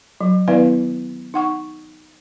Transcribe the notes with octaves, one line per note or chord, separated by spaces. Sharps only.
F#3
D#3 B3 E4 B4 D5 F5
D#4 F#5 C#6